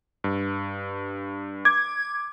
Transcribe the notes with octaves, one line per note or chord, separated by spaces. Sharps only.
G2
D6 G#6